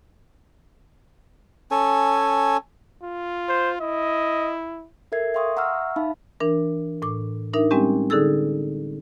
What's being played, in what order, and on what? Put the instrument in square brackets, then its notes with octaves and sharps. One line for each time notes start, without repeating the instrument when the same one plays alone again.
[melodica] C#4 A4 G#5
[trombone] F4
[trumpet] C5
[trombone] E4 [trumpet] D#5
[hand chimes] A4 A#4 E5 G#6 C7
E5 F5 G5 C6 C#6 D#6
E5 F#5 A#5 C#6 E6 F6
D#4 E5 F5 A5 B5
[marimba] E3 D4 A#4
A2 D6
D4 D#4 A#4 E5
G3 G#3 C4 C#4 G4
D3 D#4 G#4 A4 E6